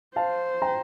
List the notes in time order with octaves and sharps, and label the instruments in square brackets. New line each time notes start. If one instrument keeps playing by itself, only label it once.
[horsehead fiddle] C5 [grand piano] F5 A5
[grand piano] G5 A#5